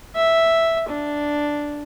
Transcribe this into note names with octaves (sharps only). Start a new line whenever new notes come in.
E5
D4